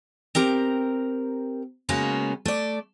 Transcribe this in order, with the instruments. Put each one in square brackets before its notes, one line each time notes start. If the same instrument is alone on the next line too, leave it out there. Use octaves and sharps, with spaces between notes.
[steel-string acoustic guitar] C4 G4 A#4 A#5
C#3 G#3 A#3 B3 C#4 F#4
A3 D5